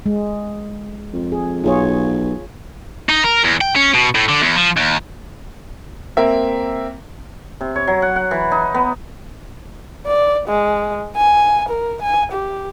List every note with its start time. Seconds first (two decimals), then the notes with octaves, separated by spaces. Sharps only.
0.06 G#3
1.13 F2
1.32 G#4
1.64 B1 F4 G#4 C#5
3.09 D#4
3.24 A#4
3.44 E2
3.61 G5
3.76 C#4
3.94 B2
4.15 A2
4.29 D3
4.41 E2
4.56 F3
4.77 D#2
6.17 A#3 C4 A#4 E5
7.61 C3
7.76 C#5
7.87 F#3
8.02 F#5
8.16 F#5
8.31 E3
8.52 D#4
8.74 B3
10.06 D5
10.48 G#3
11.16 G#5
11.69 A#4
12.02 G#5
12.32 G4